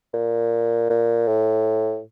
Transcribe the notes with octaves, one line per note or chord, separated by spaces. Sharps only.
A#2
A#2
A2